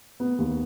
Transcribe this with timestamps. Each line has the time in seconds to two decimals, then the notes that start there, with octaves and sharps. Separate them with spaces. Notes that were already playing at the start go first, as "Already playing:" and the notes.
0.20 B3
0.39 D#2